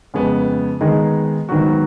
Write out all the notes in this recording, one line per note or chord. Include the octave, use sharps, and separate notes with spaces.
F2 C#3 G#3 B3
D#3 G#3 B3 D#4 G#4
G#2 D#3 F#3 B3 F#4